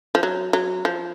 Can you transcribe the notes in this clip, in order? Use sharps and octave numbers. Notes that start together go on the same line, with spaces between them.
F3
F#3
F#3
F3